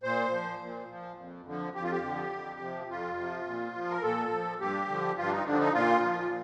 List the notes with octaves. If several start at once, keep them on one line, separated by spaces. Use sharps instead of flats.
A#2 C5
F3
A#2
F3
F2
D3 F3
F2 G4
F4
G4
D3 F3
F2
C3 F3
F2 F4
C3 F3
A#2
F3
A#4
A#2 A4
F3
G2 G4
D3 F3
G2 F4
D4
D#4
D3 F3 D4
D#4
A#2 F4
F3